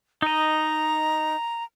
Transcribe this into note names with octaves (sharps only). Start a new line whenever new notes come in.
D#4 D#5 A#5